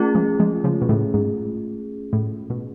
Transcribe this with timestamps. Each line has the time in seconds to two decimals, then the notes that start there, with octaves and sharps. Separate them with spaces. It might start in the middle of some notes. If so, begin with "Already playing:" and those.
Already playing: A3 C#4 F4 G#4
0.15 F3 G#3
0.40 F3 G#3
0.64 C#3 F3
0.82 B2
0.89 A2 C#3
1.14 G#2
2.13 A2
2.50 B2